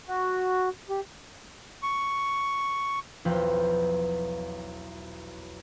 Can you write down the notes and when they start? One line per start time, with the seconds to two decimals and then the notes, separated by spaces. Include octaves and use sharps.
0.08 F#4
0.89 G4
1.83 C#6
3.25 B1 E2 F3 F4 B4 G5